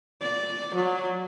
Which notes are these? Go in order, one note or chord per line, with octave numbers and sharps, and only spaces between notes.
D5
F#3